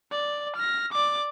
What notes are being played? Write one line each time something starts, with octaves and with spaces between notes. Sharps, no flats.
D5
F6 A#6
D5 D6